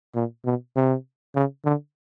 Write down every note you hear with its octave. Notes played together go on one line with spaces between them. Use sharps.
A#2
B2
C3
C#3
D3